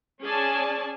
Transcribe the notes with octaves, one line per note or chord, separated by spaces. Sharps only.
C#4 G#4 D5 G#5 A5